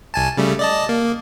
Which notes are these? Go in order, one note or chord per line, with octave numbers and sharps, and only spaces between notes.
C2 G#5 A5
C#3 G3 A3
D5 D#5 A5
A#3